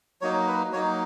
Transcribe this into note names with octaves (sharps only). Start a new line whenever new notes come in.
F#3 A#3 D#4 C#5
B4
F#3 A#3 D#4 C#5